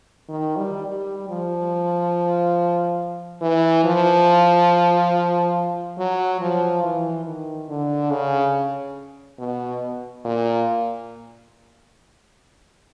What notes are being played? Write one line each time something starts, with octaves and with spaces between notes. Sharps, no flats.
D#3
G3
G3
F3
E3
F3
F#3
F3
E3
D#3
D3
C#3
B2
A#2